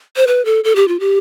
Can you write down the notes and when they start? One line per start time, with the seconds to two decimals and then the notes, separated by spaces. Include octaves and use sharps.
0.17 C5
0.27 B4
0.45 A4
0.64 A4
0.76 G4
0.88 F4
1.00 G4